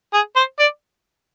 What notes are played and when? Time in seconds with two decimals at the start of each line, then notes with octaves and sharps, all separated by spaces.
0.14 G#4
0.36 C5
0.59 D5